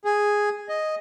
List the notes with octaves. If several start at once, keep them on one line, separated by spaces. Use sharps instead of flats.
G#4
D#5